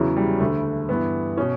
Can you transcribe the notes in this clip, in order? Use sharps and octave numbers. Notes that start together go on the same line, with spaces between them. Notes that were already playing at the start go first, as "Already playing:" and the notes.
Already playing: E2 C#3 E3 F#3
G3
D2 D3 A3
G2 E3 B3
B2 C#4